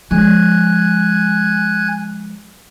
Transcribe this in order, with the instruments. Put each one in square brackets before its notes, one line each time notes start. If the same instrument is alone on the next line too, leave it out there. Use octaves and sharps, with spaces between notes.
[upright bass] F3 G#3 [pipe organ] G#5 F#6 G#6